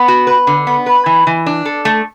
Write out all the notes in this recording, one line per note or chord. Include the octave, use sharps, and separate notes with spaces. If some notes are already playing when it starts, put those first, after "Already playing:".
Already playing: B3
F#4
B4
D3
B3
B4
E3
E3
D4
A4
A3